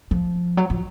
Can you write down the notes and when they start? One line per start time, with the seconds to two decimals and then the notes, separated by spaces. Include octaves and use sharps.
0.11 F3
0.57 F#3
0.70 F3